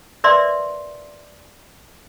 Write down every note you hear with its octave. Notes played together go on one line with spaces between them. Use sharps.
A#4 B4 D5 E5 C6